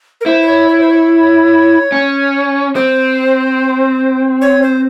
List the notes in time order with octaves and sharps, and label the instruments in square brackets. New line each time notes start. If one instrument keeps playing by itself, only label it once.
[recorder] A#4
[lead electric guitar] E4 [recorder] C5
[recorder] C5
C#5
C#5
C5
C#5
[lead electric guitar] C#4
[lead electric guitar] C4 [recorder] C5
[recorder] C#5
C5